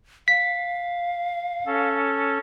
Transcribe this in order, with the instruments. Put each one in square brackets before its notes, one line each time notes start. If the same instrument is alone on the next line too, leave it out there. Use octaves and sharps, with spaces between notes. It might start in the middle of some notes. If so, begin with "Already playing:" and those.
[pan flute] F5 [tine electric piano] B6
[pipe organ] C#4 A4